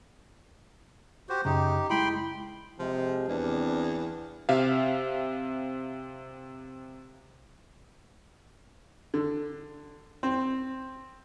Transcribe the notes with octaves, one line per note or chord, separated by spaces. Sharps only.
F#4 G4 C5
F#2 C#3 D#4 G4
G#3 E4 G5 B5 C6
C3 F3 G#3
E2 C4 D4
C3 E5 F5
D3
C4